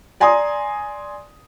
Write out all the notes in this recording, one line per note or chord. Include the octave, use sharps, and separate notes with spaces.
D5 G#5 A#5 C6 D#6